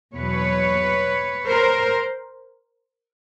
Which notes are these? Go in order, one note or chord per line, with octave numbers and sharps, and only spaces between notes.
E2 B2 F#3 B4 C#5
A#4 C5